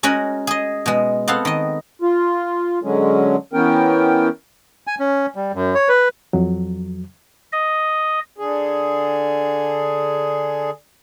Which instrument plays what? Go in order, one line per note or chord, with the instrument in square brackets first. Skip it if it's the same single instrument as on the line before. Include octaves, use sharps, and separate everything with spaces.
[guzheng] G#3 C#4 F#4 A#4 F#5 G#5
G#4 D#5
B2 G#3
B3 C4 A4 F5 F#5
D#3 D#5
[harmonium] F4
D3 F#3 G#3 C#4
E3 B3 C#4 A#4 G5
[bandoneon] G#5
C#4
G3
F#2
C#5
B4
[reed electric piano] F2 F#3
[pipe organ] D#5
[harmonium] D3 G#4